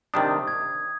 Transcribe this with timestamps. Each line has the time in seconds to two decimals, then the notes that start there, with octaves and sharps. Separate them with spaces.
0.14 C3 D#3 G3 D4 D#6
0.48 G#6